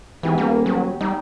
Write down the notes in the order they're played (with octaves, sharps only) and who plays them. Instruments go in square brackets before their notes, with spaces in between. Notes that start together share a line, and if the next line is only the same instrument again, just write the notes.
[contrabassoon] G#2 [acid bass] E3 [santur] B3 G4 G#5
[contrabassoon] D#1 [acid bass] A#3
[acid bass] F#3
[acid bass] G3 [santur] D#4